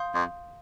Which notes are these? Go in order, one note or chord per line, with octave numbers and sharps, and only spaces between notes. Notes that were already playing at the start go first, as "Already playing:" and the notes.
Already playing: F5 C6 D#6 G6
F2